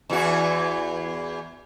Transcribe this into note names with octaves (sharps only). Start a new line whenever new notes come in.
E2 E3 F#4